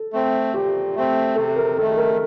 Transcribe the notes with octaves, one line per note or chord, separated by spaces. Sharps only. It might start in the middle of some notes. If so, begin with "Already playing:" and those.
Already playing: A4
A3 C4
A#2 G4
A3 C4
C3 A4
A#4
D#3 A3 A4
A4
A#4